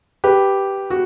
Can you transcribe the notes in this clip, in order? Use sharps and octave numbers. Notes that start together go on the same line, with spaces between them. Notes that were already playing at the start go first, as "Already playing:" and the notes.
G4 B4
F#4